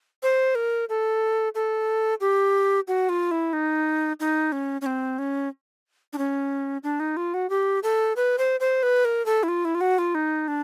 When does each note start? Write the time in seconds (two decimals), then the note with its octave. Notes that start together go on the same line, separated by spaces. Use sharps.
0.23 C5
0.55 A#4
0.89 A4
1.55 A4
2.21 G4
2.88 F#4
3.09 F4
3.31 E4
3.53 D#4
4.20 D#4
4.52 C#4
4.81 C#4
4.86 C4
5.18 C#4
6.13 D4
6.18 C#4
6.83 D4
7.00 D#4
7.17 F4
7.34 F#4
7.50 G4
7.83 A4
8.16 B4
8.38 C5
8.60 C5
8.83 B4
9.05 A#4
9.26 A4
9.43 E4
9.48 F4
9.65 E4
9.75 F4
9.81 F#4
9.98 F4
10.15 D#4
10.48 D4